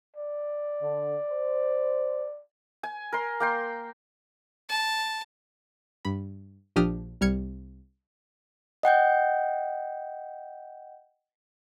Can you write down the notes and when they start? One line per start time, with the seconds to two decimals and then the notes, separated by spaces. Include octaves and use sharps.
0.16 D5
0.82 D3
1.29 C5
2.83 G#5
3.12 A#4 C6
3.40 A#3 G5 C6
4.69 A5
6.05 G2 B5
6.76 A#1 F3 D4 G4 D#6 F6
7.21 C2 G3 F6 G#6 C#7
8.83 D#5 F#5 G5 G6